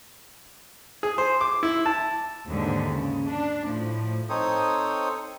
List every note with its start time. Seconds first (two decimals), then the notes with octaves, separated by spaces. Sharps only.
1.03 G#4
1.18 C5
1.41 D6
1.63 E4
1.86 A5
2.47 D#2 G#2 D3
2.89 C#3
3.28 D4
3.65 A2 F3
4.29 C4 D#4 A4 C5 C#5 D#6